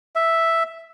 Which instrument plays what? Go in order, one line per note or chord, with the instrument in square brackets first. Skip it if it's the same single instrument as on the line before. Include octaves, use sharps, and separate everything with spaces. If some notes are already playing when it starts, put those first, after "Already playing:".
[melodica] E5